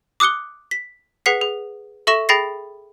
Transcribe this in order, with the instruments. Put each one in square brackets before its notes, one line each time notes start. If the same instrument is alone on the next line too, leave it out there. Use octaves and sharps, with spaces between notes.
[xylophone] D6 D#6 F#6 C#7 G7
B6
G#4 B4 F#5 B6 C7
G#4
A4 E5 C#6 A#6 E7
G#4 G5 B5 A6 A#6 C7